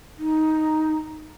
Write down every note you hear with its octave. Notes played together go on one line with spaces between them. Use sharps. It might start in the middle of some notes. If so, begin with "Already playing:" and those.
D#4